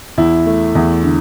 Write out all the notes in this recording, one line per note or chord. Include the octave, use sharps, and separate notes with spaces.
E2 E4
A3
E2
D3